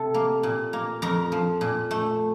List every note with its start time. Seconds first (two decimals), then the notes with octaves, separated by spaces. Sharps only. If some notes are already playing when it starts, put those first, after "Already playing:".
Already playing: C3 A4 A5
0.14 A#3
0.43 A#2
0.73 A#3
1.02 F2 A#4 A#5
1.32 F3
1.61 A#2
1.91 A3